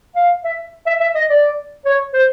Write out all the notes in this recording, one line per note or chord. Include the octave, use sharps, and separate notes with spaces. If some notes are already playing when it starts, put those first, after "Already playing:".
F5
E5
E5
E5
D#5
D5
C#5
C5